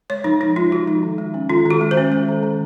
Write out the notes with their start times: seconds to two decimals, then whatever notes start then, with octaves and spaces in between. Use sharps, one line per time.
0.10 G#3 C#5
0.24 F3 D#4
0.40 F3 D#4
0.56 G#3 F4
0.71 F3 F#4
0.87 G#3 D#4
1.03 D#3
1.18 G#3
1.34 C#4
1.50 D#3 F4
1.66 D#3 F#4
1.81 G#3
1.91 C5
1.97 C#4
2.12 G#3
2.28 D#3
2.43 D#3